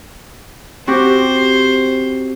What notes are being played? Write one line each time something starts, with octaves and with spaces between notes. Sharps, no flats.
C4 F#4 G4 C5